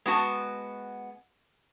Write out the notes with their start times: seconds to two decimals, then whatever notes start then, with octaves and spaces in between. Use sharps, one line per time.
0.06 G#3 B3 F#4 A5